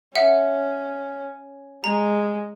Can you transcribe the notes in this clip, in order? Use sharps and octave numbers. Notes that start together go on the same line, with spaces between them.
C#4 E5 F#5
G#3 A#5